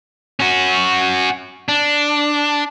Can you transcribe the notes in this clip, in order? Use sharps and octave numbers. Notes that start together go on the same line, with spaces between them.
C#4 F#4
D4